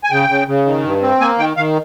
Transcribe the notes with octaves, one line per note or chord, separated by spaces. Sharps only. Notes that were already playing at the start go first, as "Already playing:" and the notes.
G#5
C#3 G5
C#3
C#3
D#3
G2
C4
A#3 G#5
D#3 G5
D#3 F5